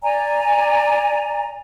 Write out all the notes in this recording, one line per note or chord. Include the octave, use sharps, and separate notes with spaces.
D5 G#5 A#5